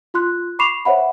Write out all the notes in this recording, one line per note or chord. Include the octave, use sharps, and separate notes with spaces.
F4 C6 F#6
B5 C#6 D6 C7 E7 F7
C5 C#5 E5 F#5 B5